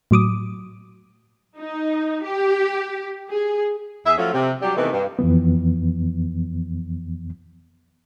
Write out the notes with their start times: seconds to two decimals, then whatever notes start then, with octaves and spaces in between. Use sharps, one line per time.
0.11 A2 F#3 D6 D#6
1.57 D#4
2.24 G4
3.29 G#4
4.06 E2 G#4 E5
4.18 F3 F#3 A3 C#4 F4
4.34 C3
4.62 F#3 G3 D4 G4
4.76 C3 D#3 E3 A3 B3
4.92 G2
5.19 F2 E3 F3 B3